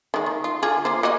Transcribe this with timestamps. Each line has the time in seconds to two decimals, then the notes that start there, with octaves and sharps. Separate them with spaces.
0.14 D#3 G#3
0.26 D#3
0.44 F4
0.63 D3 F4 G#4
0.85 A#3 F4 C5
1.03 A#3 F#4 D#5